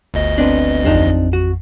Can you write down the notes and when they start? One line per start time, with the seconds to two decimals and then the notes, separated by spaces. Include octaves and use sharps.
0.14 G1 D2 D#5
0.38 B3 C4 D4
0.85 A1 F2 C4 D4 D#4
1.33 F#4